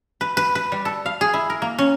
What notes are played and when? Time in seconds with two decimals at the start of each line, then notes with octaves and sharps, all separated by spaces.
0.21 B4
0.37 B4
0.55 B4
0.72 G3
0.85 A4
1.06 F5
1.21 G#4
1.34 E4
1.50 A#4
1.62 A#3
1.79 C#4